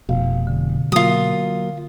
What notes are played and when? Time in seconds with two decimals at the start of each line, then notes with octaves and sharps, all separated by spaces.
0.09 F1 B2 F5
0.47 D3
0.92 F#3 A#3 F4 D#6